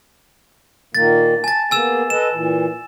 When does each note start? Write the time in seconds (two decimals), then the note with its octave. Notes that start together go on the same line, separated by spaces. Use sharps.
0.95 A#2 D#3 A#3 A6
1.44 G#5 A5 A6
1.71 A#3 B3 G#4 G#5 E6 E7
2.10 A4 B4 D#5 E7
2.33 A#2 E3